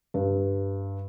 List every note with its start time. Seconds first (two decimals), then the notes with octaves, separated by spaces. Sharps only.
0.14 G2